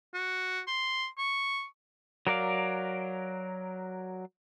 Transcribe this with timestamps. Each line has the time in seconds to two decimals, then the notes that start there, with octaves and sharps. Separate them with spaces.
0.14 F#4
0.67 C6
1.18 C#6
2.27 F#3 A#4 D5 F5